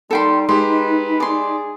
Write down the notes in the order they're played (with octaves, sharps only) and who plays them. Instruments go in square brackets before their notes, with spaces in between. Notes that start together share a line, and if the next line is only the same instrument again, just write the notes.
[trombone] G3 [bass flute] D#4 [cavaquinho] A4 G5 C6
[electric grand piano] G#3 G4 [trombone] B4 [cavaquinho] C6
[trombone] G#4 [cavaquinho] D5 C6